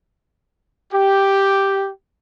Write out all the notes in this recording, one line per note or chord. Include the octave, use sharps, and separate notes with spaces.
G4